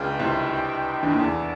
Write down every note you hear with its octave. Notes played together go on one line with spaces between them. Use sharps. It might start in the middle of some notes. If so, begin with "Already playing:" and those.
Already playing: C#2 C#3 D4 F#4 B4 D#5 G5
C2 C3
D2 D3
D#2 D#3
E2 E3 A#3 D4 F#4 A4 D5